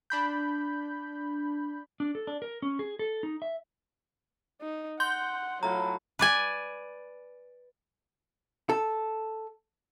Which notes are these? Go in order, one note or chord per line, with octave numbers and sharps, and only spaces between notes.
D4 B5 G6
D4
A4
D4
A#4
C#4
G#4
A4
D#4
E5
D#4
F#5 C6 G6
A2 F#3 E4 F4 A#5
B4 D5 G#5
A4